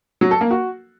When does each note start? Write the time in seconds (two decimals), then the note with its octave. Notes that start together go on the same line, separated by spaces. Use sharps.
0.21 F#3
0.31 A4
0.41 A#3
0.51 F#4